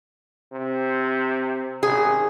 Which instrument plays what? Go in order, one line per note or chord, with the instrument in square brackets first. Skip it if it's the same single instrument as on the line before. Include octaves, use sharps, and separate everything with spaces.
[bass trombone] C3
[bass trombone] G#1 [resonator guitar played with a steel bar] G#4